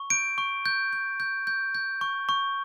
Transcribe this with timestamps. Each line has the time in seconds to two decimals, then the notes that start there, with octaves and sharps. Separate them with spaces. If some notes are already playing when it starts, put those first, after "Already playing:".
Already playing: C#6
0.10 G6 D7
0.38 C#6
0.66 G6
0.93 G6
1.20 G6
1.47 G6
1.75 G6
2.01 C#6
2.29 C#6